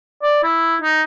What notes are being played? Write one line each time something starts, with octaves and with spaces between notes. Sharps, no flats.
D5
E4
D#4